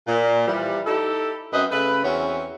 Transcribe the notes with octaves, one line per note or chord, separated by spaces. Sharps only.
A#2
E3 F3 G3
D#4 E4 G4 A4
F#2 C4 B4 D#5
C#3 A3 B4
E2 C4 C#4 F#4 C#5